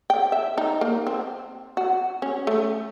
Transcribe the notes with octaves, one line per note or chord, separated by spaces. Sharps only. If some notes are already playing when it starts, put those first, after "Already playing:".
G5
E5
D#4
A#3
C4
F#4
C#4
A3